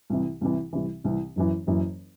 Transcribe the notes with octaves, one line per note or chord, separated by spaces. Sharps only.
C2 C3 E3
C2 C3 E3
C2 C3 E3
C2 C3 E3
F#1 F#2 E3
F#1 F#2 E3